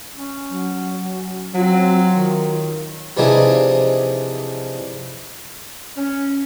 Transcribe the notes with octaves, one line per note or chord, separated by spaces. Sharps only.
C#4
F#3
F#3 C4 F4
D#3
C3 E3 F3 D4 D#4 G#4
C#4